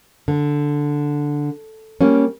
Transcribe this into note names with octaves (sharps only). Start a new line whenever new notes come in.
D3
G3 A#3 C#4